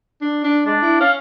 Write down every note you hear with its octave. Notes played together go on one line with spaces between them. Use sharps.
D4
D4
G#3 D4
E4
C#4 F5